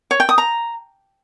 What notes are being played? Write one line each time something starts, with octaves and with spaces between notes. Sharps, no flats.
C#5
G5
D#6
A#5